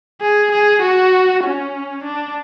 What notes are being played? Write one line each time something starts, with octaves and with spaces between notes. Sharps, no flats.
G#4
G#4
F#4
C#4
D4